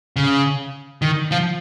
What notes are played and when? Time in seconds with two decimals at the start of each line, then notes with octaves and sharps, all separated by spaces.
0.16 C#3
1.02 D#3
1.32 F3